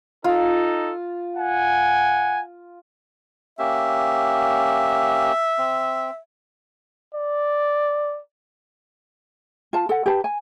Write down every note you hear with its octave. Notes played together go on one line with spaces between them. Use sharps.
D#4 F4 A4
F#5 G#5
A#3 C#4 G4 E5
C4
D5
F4 A5
A4 F#5
G4 B4 G5 A5
G#5